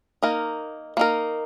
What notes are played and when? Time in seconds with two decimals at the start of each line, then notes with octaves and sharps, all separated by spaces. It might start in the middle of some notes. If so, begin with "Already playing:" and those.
0.23 A#3 D#4 A#4
0.97 A#3 D#4 A#4